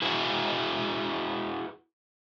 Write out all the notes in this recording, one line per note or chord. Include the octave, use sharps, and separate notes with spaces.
E4 F#4 G#4 B4